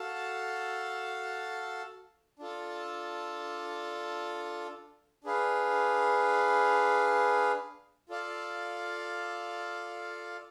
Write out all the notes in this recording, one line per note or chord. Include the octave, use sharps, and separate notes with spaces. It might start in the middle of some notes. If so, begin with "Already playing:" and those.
Already playing: F#4 A4 F5 A5
D4 F4 A4
D4 G#4 B4 F5
F4 A4 D5 F5